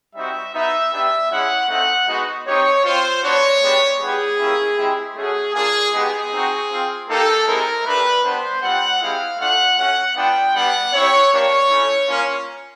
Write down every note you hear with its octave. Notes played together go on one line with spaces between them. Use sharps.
G3 C4 D#4 F#4 E5
B3 D#4 F#4 E5
B3 D4 G4 E5
G#3 C#4 E4 F#5
A3 C4 D#4 F#5
G#3 B3 D#4 F#4
C4 D#4 G4 C#5
C4 F4 C5
B3 D4 F#4 C#5
G#3 B3 D4 G4
G3 B3 E4 G4 G#4
A#3 C#4 E4 G4
G#3 C4 E4 G4
A3 C#4 F#4 G#4
A#3 D4 F4 G#4
G#3 B3 D#4 G4 G#4
C4 D#4 F#4
C4 F4
A#3 D#4 G4 A4
G#3 C4 E4 G4 A#4
A3 D4 G4 B4
G3 B3 D4 C5
G3 C4 F4 F#5
G#3 C4 E4 G4 F5
A3 D4 F4 F#5
A3 C#4 F#4 F#5
B3 D4 F4 G5
G3 B3 D4 G4 F#5
C4 E4 G4 C#5
A#3 D4 G4 C#5
A3 C#4 E4
A#3 C#4 F4